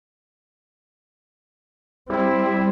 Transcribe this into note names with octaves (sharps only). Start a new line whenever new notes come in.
G3 C4 E4